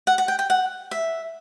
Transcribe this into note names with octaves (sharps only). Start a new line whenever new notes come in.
F#5
F#5
G5
G5
F#5
E5